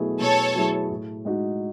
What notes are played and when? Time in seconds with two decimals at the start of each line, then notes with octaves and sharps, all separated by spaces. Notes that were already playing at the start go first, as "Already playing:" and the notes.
Already playing: B2 F#3 A3 E4 G#4
0.20 B2 A4 C#5
0.55 F#3 A3 E4 G#4
0.90 A2
1.25 G#3 D#4 F#4